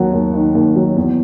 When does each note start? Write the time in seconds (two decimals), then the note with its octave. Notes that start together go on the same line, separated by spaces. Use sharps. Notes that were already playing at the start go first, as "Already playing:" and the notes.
Already playing: D#2 F#3 F#5
0.13 D#2
0.34 D#3
0.55 D#2
0.76 F#3
0.96 E2